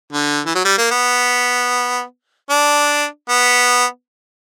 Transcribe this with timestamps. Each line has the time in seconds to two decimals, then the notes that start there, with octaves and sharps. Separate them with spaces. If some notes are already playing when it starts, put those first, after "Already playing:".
0.13 D3
0.46 E3
0.55 F#3
0.65 G3
0.78 A#3
0.91 B3
2.50 D4
3.29 B3